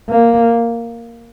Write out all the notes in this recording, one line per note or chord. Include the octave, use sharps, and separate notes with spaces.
A#3